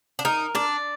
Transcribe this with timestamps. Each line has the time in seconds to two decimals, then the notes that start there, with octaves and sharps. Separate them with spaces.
0.19 D4
0.25 D#4 A#4
0.55 D4 D5